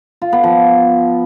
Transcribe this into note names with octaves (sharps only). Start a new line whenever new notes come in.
F4
B3
F3